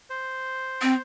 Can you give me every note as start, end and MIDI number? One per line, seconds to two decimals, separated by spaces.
0.10 1.02 72
0.82 0.94 60